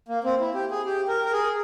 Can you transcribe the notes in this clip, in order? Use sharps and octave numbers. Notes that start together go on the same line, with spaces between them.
A#3
C4
E4
G4
G#4
G4
A#4
A#4
G#4